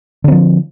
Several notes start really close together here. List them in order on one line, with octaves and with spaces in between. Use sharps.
D3 C4 F3